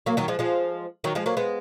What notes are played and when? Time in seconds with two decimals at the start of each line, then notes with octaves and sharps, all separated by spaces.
0.06 F#3 A#3
0.17 D#3 F#3
0.28 F3 G#3
0.39 F3 G#3
1.04 D#3 F#3
1.15 F3 G#3
1.26 F#3 A#3
1.37 G#3 B3